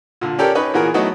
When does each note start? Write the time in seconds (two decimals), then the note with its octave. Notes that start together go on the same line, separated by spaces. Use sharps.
0.21 A#2 D3
0.39 C#4 G4 A4 A#4 D5 G5
0.55 C#4 D#4 B4 C#6
0.73 A#2 E3 B3 F#4 G#4 A#4
0.94 F#3 A3 B3 D#4 E4 F#4